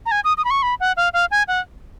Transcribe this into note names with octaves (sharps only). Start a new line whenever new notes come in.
A#5
G#5
D#6
D#6
B5
C#6
B5
F#5
F5
F5
G#5
F#5